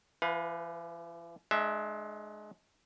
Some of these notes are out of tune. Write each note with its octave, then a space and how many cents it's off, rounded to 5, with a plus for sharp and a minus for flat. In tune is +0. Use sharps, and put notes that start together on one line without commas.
E3 +45 B4 +0 F5 +30
G#3 +25 D4 +45 E5 +0